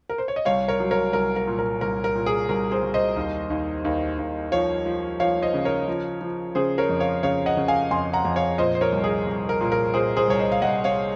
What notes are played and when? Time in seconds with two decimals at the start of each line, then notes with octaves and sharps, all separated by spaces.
0.09 A#4
0.18 C5
0.28 C#5
0.36 D#5
0.45 C2 C#5 F5
0.68 A#4 C#5
0.80 F#3
0.91 A#4 C#5
1.13 C2 A#4
1.36 A#4
1.47 A#2
1.59 A#4
1.81 C2 A#4
2.04 A#4
2.15 A#2
2.26 G#4
2.49 C2 A#4
2.71 G#4 C5
2.82 C2
2.94 C5 D#5
3.16 D#2
3.50 D#2
3.85 D#2
4.19 D#2
4.52 F3 C#5 F5
4.86 F3
5.20 F3 C#5 F5
5.42 C5 D#5
5.54 C#3
5.65 A#4 C#5
5.87 F3
6.21 F3
6.55 C#3 G#4 C5
6.78 A#4 C#5
6.89 F2
7.00 C#5 F5
7.23 C#3 C#5 F5
7.46 D#5 F#5
7.57 C#3
7.68 F5 G#5
7.90 F2 G#5 C6
8.13 F#5 A#5
8.25 F2
8.36 C#5 F5
8.58 A#2 C5 D#5
8.75 C5
8.81 A#4 C#5
8.92 C2
9.04 G#4
9.27 C2
9.49 A#4
9.61 A#2
9.72 A#4
9.94 A#2 G#4 C5
10.16 G#4 C5
10.28 C2 C#5
10.39 C5 D#5
10.52 F5
10.62 C2 D#5 F#5
10.84 C#5 F5